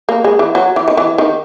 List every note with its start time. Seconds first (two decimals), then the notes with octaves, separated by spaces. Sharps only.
0.09 A#3
0.24 G#3
0.39 E3
0.55 F#3
0.76 E3
0.88 D#3
0.97 E3
1.18 D#3